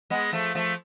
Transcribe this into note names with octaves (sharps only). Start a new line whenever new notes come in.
G#3 B3
F3 A3
F3 A3